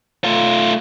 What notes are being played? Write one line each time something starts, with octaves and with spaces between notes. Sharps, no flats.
A3 F4